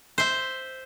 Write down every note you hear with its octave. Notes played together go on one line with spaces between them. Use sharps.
C5 E5